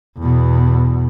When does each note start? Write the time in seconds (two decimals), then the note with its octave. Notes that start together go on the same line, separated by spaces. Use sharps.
0.18 E2 B2